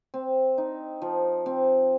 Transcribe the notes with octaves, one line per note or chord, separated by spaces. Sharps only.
C4
D#4
F3
C4